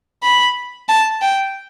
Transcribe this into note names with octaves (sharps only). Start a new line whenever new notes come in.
B5
A5
G5